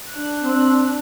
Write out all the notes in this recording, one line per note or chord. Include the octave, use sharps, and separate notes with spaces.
D4 F#6
C4